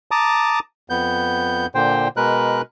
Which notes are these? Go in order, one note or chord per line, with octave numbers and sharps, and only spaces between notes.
A5 A#5 D6 D#6
F2 B3 G6
A#2 D3 C5 G5
B2 G#3 A#4 B4 F#6